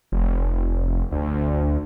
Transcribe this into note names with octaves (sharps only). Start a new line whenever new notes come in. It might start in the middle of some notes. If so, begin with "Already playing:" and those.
F1
D2